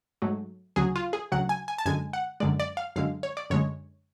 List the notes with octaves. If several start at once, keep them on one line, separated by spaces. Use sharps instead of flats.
G#2 F#3 A3
D2 C#3 F#3 G#4
F4
G#4
D2 C#3 F#3 F#5
G#5
G#5
A5
F#2 D3 G#3 G#5
F#5
F#2 D3 G#3 D5
D5
F5
F#2 D3 G#3 F5
C#5
D5
F#2 D3 G#3 C#5